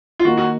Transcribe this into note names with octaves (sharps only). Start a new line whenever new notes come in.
F4
D#3 A#3 D#4 F#4
F#4